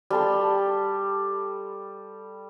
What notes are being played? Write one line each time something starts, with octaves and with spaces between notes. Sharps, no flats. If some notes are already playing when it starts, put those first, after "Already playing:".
G3 A4 C6